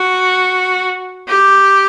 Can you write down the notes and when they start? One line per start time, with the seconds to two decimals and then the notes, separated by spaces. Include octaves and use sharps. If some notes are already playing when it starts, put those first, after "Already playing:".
Already playing: F#4
1.29 G4